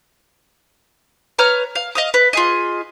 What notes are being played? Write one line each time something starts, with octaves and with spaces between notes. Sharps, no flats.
B4 C#5 A#5 F6
F5
D#5 F5 D#6
B4
F4 G#4 D#5